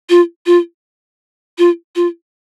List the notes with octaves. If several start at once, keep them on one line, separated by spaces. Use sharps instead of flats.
F4
F4
F4
F4